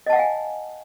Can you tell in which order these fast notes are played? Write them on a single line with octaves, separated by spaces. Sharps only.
D#5 A5 F#5 F5 G#5